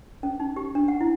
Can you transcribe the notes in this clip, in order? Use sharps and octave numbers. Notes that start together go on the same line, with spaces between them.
C#4
D#4
G4
D4
F#5
E4